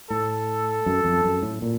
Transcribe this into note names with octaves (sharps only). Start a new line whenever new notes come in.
A2 A4
F#2
F2
F#2
A2
A#2